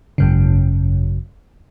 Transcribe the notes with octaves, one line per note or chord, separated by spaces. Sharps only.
G#1 F#2 C#3